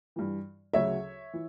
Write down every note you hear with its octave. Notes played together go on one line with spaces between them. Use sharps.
G2 E3
D2 C#3 F#3 C#5 E5
E3